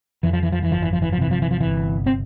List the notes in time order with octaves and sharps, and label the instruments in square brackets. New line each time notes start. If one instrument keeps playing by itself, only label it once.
[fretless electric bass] F2 E3
F3
E3
F3
E3
G1 F3
E3
F3
E3
F3
C3 E3
F3
E3
F3
G1 E3
C4